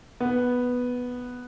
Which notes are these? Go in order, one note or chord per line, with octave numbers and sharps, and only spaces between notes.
B3